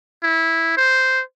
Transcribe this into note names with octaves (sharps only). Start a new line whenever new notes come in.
E4
C5